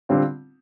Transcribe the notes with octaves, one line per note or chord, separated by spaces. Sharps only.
D3 G3 C4 F4